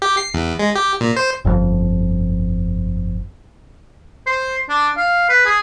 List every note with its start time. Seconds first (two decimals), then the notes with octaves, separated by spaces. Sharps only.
0.02 G4
0.17 C7
0.34 E2
0.59 G#3
0.75 G4
1.01 A#2
1.16 C5
1.45 G1 F2
4.27 C5
4.70 D4
4.97 F5
5.29 B4
5.46 G#4